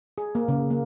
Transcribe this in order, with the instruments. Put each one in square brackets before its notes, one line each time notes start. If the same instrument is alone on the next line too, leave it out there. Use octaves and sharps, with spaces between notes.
[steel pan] G#4
A#3
C#3
A#3